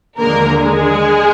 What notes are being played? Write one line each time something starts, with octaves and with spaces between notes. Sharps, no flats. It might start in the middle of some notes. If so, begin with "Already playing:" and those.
D#2 D3 F3 G#3 A#3 A#4
G#3 G#4